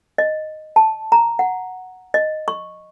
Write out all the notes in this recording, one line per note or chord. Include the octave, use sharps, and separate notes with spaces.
D#5
A5
A#5
F#5
D#5
C#6